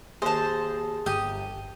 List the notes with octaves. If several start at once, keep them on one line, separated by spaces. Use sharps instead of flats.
D#2 G#4 C5 A5
G1 G4 D#6